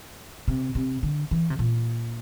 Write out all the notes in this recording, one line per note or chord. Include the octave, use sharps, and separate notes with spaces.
C3
C3
D3
E3
C3
A#2